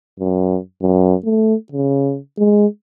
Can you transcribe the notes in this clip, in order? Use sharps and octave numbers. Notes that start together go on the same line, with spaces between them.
F#2
F#2
A3
C#3
G#3